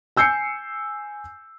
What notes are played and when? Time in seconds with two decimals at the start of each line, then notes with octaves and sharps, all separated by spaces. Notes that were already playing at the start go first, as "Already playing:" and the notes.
0.17 G#5 E6 G6 C7 C#7